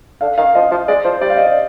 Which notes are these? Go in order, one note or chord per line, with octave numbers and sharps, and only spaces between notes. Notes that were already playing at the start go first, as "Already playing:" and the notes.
D3 F5
D#3 F5
F3 D#5
F3 D#5
G#3 D5
F3 C5
G3 D5
F5
D#5
D5